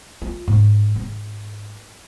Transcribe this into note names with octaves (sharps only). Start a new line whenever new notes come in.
F4
G#2
G#2